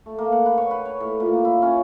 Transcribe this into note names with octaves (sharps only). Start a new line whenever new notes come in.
A3
A#3
F#5
B4
C#5
B4
C#5
A2
A#2
A#3
E4
C#4